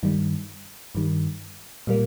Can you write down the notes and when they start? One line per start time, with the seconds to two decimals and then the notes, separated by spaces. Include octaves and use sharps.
0.03 G2 D#3 G3
0.95 G2 D#3 G3
1.87 A#2 G3 A#3